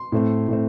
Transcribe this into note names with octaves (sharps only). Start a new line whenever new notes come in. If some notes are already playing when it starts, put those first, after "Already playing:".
Already playing: C6
A2 A3 C4
A2 A3 C4